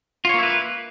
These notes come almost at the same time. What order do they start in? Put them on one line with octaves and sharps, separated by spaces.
F4 C#5 A#3 E4 B4